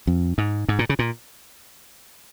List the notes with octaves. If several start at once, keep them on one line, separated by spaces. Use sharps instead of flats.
F2
G#2
G#2
A#2
C#3
A#2